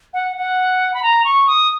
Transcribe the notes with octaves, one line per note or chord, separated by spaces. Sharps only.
F#5
F#5
B5
A#5
C#6
D#6